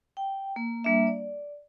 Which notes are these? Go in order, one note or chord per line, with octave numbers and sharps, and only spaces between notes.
G5
A#3
G3 A#3 D4 E5
D5